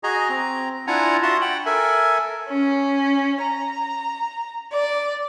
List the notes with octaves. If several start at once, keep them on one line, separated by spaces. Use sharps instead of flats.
F#4 G#4 D#5 G#5 A#5
C4 A#5
D4 E4 F4 F#5 G#5 A#5
F4 F#4 E5 F#5 A5 C6
F#5 G5 B5
A4 A#4 E5 G#5
C#4
A#5
D5